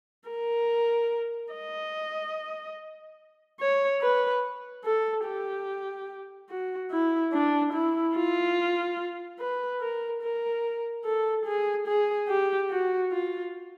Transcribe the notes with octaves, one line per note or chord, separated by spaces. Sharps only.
A#4
D#5
C#5
B4
A4
G4
F#4
E4
D4
E4
F4
B4
A#4
A#4
A4
G#4
G#4
G4
F#4
F4